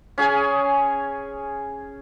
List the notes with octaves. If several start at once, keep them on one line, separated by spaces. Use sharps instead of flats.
C#4 G#4 G#5